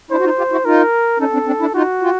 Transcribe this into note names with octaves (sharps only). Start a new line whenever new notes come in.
D4 E4 C5
F#4
D#4 F4
F4 G4
E4 F#4
D#4 F4 A#4
C#4 D#4 A4
C4 D4
C4 D4
D4 E4
D#4 F4 F#4
F4 G4